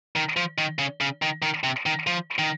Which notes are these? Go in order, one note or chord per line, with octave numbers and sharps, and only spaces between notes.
D#3
F3
D#3
C#3
C#3
D#3
D#3
C3
D#3
F3
D#3